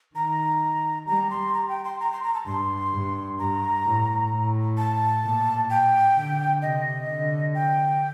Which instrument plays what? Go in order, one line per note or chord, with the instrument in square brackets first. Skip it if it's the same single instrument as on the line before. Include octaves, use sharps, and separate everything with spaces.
[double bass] D#3 [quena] A#5
[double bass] G3 [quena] A#5
[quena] C6
A#5
G5
C6
A#5
C6
A#5
A5
[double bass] G2 [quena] C6
[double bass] G2
[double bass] G2 [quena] A#5
[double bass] A2
A2
[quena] A5
[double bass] A#2
[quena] G5
[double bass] D3
[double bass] C3 [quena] D#5
[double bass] D3
[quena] G5